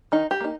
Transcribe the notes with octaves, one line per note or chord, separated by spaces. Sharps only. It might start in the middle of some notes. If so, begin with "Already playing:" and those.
D#3 D#4
G4
A#3 D#4